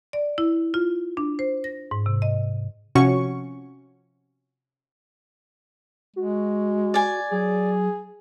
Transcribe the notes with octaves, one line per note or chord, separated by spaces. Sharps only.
D5
E4
F4
D4
C5
A#6
G#2
C3
D#5
C3 F3 C#4 F#4 C#5 C#6
G#3 F#4
D5 G#5
F#3 G#4